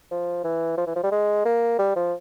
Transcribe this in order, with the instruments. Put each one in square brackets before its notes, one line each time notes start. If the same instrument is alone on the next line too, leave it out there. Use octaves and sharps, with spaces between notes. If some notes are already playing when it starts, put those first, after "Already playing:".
[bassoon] F3
E3
F3
E3
F3
G3
G#3
A#3
G3
F3